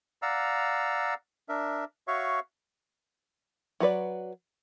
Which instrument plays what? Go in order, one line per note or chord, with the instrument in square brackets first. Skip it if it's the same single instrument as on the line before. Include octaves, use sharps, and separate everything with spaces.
[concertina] D5 F5 F#5 A#5 E6
D4 A#4 E5
F#4 C#5 E5 F5 C#6
[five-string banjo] F#3 F#4 B4 D5